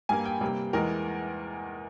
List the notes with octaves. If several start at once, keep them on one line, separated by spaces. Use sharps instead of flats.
G2 G3 A#3 G#5
G5
C3 G3 A#3
E2 E3 G#3 A#4